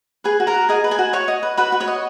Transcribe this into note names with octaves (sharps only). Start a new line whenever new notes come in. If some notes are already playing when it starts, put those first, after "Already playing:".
G#4 B4 G#5
F#4
A#4 A#5
F#4
G#4 D#5 G#5
B4
G#4 G#5
F#4
F#4 C#5 C#6
D#5
B4
F#4 B4 B5
F#4
C#5 C#6
D#5